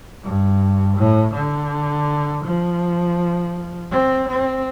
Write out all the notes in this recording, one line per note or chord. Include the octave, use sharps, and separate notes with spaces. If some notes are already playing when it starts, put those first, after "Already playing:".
G2
A2
D3
F3
C4
C4